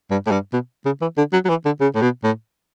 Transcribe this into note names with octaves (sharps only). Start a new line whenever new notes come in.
G2
A2
G2
B2
C#3
E3
D3
F#3
F#3
E3
D3
C#3
A2
B2
A2